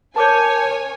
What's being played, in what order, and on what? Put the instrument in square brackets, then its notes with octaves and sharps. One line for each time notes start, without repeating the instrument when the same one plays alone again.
[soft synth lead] A#4 [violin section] C#5 G#5 [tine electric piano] A5 D6 G6